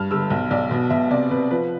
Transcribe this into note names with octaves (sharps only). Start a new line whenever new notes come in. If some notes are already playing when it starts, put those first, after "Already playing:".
Already playing: G2 F6
G1 E6
B1
B1 D5
B2
B2 E5
C3 D5
C3 B4
F3 B4